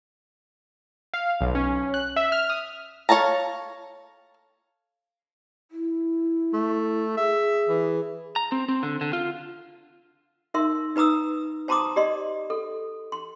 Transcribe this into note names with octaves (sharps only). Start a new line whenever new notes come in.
F5
B1
C#4
F#6
E5
F6
D#6
A4 C#5 F5 A5 A#5
E4
A3
G#4 E5
E3
A#5
C4
C4
D3
D3
F4
D#4 A#4 E5 C6
D#4 B4 A#5 D#6 E6
C5 A5 A#5 C6 D6 D#6
G4 D5 D#5 C6
A4
C6